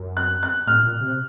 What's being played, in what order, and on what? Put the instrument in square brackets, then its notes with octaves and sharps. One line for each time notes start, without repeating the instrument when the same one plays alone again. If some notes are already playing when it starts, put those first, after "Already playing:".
Already playing: [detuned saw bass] F#2
[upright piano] F#6
F#6
[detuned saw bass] A2 [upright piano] F6
[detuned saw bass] A#2
C3